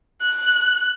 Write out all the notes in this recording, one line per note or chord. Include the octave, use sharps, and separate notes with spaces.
F#6